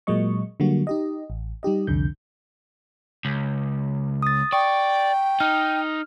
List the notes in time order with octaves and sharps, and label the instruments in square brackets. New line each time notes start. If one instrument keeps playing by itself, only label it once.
[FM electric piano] A#2 F#3 G#3 A#3 D#5 C#6
D3 F#3 G3 A#3 F#4
D#4 G4 D#5
A1
G3 D#4 G4 D#5
C2 F2 D3 G6
[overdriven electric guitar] C#2
[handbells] D#6 A6
[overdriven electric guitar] D5 [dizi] G5 [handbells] C#6
[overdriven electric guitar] D#4 [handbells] F6